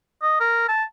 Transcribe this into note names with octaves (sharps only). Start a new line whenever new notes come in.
D#5
A#4
A5